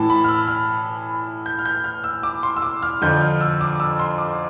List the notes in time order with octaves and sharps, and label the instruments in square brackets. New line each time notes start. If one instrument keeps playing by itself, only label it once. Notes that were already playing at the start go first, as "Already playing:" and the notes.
Already playing: [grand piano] A2 E3 A5
B5
F6
E6
F6
G6
F6
G6
F6
E6
D6
C6
E6
D6
F6
F2 D3 F3 G6
F6
E6
D6
E6
C6
D6